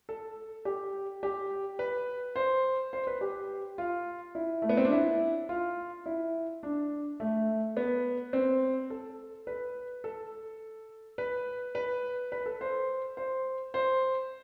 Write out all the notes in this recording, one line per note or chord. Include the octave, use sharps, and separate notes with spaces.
A4
G4
G4
B4
C5
C5
B4
G4
F4
E4
A3
B3
C4
D4
E4
F4
E4
D4
A3
B3
C4
A4
B4
A4
B4
B4
B4
A4
C5
C5
C5